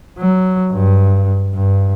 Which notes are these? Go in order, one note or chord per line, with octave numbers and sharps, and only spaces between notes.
F#3
G2
G2